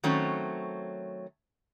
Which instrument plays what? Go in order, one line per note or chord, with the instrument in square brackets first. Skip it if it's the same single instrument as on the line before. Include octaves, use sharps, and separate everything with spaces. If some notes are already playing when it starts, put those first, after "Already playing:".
[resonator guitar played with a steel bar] D#3 F#3 A3 C4 C#4 C#5